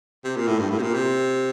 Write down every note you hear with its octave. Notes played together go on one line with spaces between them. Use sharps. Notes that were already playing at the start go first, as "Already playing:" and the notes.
C3
A#2
A2
G2
A2
C3
A#2
C3